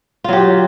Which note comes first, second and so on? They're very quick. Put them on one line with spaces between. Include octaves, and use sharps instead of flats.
F4 F#3 G4